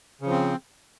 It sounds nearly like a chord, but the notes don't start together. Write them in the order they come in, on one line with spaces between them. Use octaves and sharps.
C#3 F3 C4